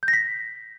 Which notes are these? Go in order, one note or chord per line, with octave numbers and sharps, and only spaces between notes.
G6
A#6
B6